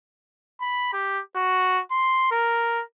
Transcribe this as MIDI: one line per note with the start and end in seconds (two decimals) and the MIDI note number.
0.61 0.90 83
0.93 1.21 67
1.36 1.81 66
1.91 2.30 84
2.32 2.83 70